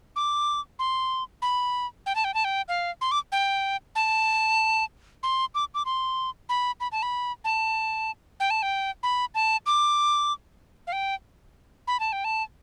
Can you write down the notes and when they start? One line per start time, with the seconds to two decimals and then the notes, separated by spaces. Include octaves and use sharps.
0.16 D6
0.79 C6
1.42 B5
2.06 G5
2.15 A5
2.24 G5
2.34 A5
2.44 G5
2.68 F5
3.01 C6
3.12 D6
3.32 G5
3.95 A5
5.23 C6
5.55 D6
5.75 D6
5.85 C6
6.49 B5
6.80 B5
6.92 A5
7.03 B5
7.44 A5
8.40 G5
8.50 A5
8.62 G5
9.03 B5
9.35 A5
9.66 D6
10.87 F5
10.93 G5
11.88 B5
12.00 A5
12.13 G5
12.24 A5